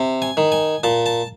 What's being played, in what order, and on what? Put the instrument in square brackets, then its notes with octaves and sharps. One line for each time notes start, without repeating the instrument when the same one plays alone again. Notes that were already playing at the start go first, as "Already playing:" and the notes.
Already playing: [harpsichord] C3
G#5
D#3
G#5
A#2 A5
A5